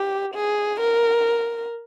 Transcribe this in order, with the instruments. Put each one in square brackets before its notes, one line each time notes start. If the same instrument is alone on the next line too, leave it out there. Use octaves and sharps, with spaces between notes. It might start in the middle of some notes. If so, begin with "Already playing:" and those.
Already playing: [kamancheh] G4
G#4
A#4